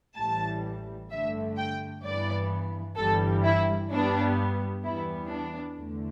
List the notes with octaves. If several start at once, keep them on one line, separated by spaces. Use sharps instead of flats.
A1 A2 E3 G3 A5
G2 D3 A3 E5
G5
G2 E3 B3 D5
G1 G2 E3 G3 A4
E4
G2 G3 B3 D4
E2 E3 G3 B3 E4
D4
E2 D3 A3